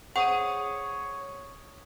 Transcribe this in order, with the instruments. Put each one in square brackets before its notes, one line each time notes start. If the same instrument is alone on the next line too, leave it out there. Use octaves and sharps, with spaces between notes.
[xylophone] G#4 C5 [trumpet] C#5 [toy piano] F#5 [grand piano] C#6 D#6 D#7